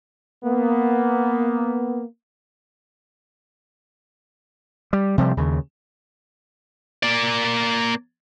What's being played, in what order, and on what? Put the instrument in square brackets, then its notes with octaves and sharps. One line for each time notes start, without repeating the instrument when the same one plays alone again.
[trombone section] A#3 B3
[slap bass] G3
C3 F3 G3
D#2 C#3
[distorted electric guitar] A#3 D5